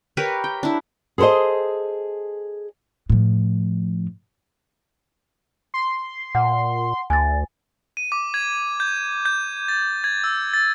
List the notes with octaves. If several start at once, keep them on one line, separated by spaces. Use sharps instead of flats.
G4 A#4 B4 C#5
G5
D4 E4
G#4 A4 B4 C5 D#5
A2 F3
C6
A#2 F#5
D2 G#5 A6
D#7
D6
G#6
G6
G6
A6
G#6
E6
A6